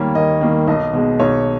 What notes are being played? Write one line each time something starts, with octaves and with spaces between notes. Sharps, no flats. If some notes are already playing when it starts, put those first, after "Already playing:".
Already playing: D#2 D#3 G3 A#3 C#5
D#2 D#5
D#3 G3 A#3
B1 D#5
B2 G#3
B1 C#5